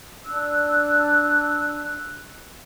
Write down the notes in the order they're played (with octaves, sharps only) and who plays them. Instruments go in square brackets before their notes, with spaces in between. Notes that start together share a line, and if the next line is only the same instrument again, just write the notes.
[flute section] D4 E6 F#6